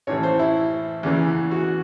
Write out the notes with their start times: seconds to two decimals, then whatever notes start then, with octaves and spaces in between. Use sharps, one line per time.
0.07 A1 A2 E3 C#5
0.23 C5
0.39 E4
1.03 E2 C#3 E3
1.51 F#4